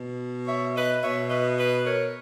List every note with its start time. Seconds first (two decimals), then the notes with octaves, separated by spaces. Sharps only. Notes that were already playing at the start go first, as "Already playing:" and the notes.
Already playing: B2
0.48 C#5 E5
0.75 B4 D#5
1.02 B2 C#5 E5
1.30 B4 D#5
1.57 B4 D#5
1.84 A#4 C#5